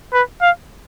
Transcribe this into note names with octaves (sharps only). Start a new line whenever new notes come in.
B4
F5